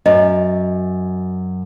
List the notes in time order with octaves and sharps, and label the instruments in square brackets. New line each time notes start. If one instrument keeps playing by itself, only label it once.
[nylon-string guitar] F#2 [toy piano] D#5